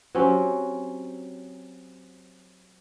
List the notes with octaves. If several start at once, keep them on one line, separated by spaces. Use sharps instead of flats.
F#3 C4 C#4 G4